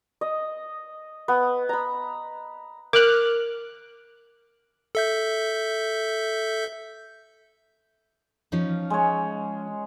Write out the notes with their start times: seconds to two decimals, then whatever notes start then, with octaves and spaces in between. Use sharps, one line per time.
0.21 D#5
1.28 B3
1.69 A#5 B5
2.93 A#4 D6 F6 F#6
4.95 A4 E5 G6
8.52 F3 C#4 D#4
8.90 G#3 C#5